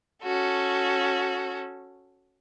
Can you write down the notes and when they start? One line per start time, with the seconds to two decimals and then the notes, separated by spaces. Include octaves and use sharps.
0.24 C#4 F#4 A4